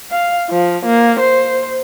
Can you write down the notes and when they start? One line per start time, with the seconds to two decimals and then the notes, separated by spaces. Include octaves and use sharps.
0.11 F5
0.49 F3
0.86 A#3
1.20 C5